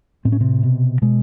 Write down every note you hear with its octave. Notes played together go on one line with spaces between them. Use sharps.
A2 C4
C#4
C3 C4
B2
B2 G#3